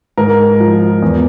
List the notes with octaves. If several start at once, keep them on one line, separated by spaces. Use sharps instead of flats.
G#2 A#4
F3
E2